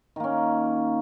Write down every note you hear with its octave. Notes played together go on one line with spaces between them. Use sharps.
D#3 A#3 C#4